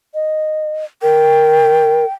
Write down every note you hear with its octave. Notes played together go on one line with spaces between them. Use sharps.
D#5
A#4 G5